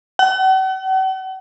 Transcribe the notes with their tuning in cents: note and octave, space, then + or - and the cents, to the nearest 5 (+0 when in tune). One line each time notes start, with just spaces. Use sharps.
F#5 +40